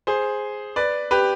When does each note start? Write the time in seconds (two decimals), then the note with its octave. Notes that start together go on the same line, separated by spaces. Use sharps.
0.07 G#4 C5
0.76 B4 D5
1.11 G4 B4